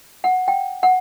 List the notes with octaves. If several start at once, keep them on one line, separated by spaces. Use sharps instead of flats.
F#5
G5
F#5